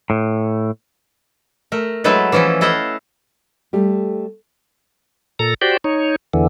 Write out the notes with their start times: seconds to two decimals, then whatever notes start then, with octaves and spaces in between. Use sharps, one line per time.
0.10 A2
1.72 A3 A#4
2.04 F#3 G#3 A3 E4 A4 B4
2.32 E3 F3 C#4 E4 A4
2.61 E4 A4 D#5 F5 F#5
3.73 G3 A3 G4
5.39 A#2 A4 A#5
5.61 F#4 G4 C5 D5 G5
5.84 D#4 C#5
6.34 E2 D3 E3